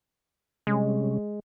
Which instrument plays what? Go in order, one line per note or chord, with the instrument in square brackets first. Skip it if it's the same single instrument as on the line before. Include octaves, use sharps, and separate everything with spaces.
[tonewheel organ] C3 G3 C#4 [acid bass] G#3